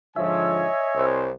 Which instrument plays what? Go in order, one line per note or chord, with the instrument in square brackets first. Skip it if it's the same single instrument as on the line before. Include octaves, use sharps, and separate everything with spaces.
[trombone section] G#2 D3 F3 [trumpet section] C#5 D#5 G#5 [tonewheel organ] E5
[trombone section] C2 C5